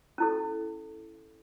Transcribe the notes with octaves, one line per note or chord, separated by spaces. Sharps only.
C#4 E4 A4